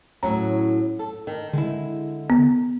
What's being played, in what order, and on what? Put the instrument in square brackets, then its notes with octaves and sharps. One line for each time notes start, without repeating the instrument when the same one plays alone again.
[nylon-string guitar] A2 F#3 C#4 [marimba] A#5
[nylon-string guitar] A4
D#3
[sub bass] D3 [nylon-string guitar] G#3 E4
[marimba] B3